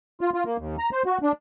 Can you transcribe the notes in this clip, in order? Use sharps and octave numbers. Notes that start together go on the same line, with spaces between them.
F4
F4
A#3
D#2
A#5
C5
F#4
D4